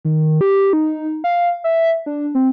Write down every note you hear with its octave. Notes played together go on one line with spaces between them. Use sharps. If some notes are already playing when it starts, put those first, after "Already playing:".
D#3
G4
D#4
F5
E5
D4
C4